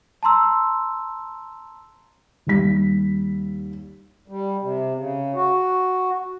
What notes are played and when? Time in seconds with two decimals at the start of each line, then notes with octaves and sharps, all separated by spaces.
0.23 A5 A#5 C6 E6
2.47 D#2 G3 B6
4.28 G3
4.62 C3
4.95 C#3
5.34 F#4